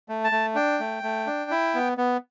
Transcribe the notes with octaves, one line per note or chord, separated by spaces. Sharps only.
A3
A5
A3
D4 G5
A3
A3
D4
E4
B3
B3